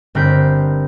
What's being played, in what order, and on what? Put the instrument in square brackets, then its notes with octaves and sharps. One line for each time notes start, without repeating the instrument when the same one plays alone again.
[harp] G1 C4 A#4 F#5 G6 B6